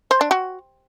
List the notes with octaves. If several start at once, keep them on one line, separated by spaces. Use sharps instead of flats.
C5
D4
F#4